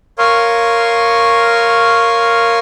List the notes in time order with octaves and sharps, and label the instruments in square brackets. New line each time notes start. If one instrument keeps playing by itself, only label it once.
[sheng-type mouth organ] A#4 C#5 F5 C6 C#6 D#6